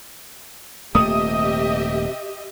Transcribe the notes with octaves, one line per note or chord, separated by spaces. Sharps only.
D#1 C3 A3 A#3 G4 D#5 E5 D#6